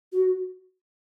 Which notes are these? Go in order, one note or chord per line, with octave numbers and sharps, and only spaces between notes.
F#4